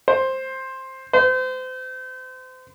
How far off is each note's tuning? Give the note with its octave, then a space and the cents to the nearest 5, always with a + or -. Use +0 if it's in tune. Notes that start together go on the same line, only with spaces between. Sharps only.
C5 +10
C5 -35